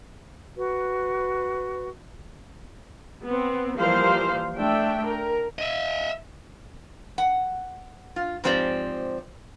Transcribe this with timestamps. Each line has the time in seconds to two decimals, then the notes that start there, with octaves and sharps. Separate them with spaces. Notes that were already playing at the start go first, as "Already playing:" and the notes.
0.57 F#4 B4
3.26 B3 C4
3.77 E3 F3 G3 A#3 C5 F5
4.58 A3 D4 E5 G5
5.05 A#4
5.59 D#5 E5
7.18 F#5
8.16 F4
8.44 G#2 F3 C4 G4 D5